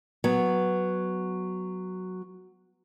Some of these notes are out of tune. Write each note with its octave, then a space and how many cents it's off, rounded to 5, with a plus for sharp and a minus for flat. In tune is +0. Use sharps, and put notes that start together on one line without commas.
F#3 +0 B3 +0